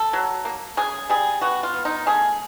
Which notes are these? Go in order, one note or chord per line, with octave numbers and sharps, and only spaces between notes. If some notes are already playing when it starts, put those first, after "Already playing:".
Already playing: A4
F#3
A#3
C#3 G#4
G3 G#4
B3 F#4
F4
B3
D#4
A3 G#4